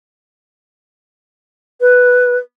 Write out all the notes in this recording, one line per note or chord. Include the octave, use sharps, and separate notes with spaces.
B4